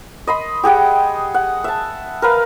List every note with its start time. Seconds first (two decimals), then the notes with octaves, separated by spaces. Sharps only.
0.27 D#5 B5 C6
0.63 G4 G#4 F#5 G5
1.34 F#5
1.64 E5 A5
2.22 A#4 B4 F5